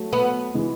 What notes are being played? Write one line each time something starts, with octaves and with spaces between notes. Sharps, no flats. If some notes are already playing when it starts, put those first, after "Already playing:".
Already playing: F#3 A3
B3
E3 G#3